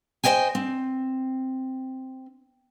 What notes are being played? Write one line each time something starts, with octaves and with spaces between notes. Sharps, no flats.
C5 D5 D#5 G5 G#5
C4